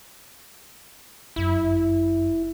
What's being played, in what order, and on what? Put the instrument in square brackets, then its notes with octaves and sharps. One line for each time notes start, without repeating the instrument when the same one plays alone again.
[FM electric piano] G1 F#2 [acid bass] E4